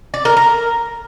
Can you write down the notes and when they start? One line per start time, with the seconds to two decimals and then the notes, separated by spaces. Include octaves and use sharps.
0.14 D5
0.25 A#4
0.37 A#4